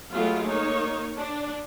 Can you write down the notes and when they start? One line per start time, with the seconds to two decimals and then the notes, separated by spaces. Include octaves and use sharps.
0.14 F#3 G#3 A3 B3 F4 G4
0.48 A#3 D#4 C#5
1.18 D4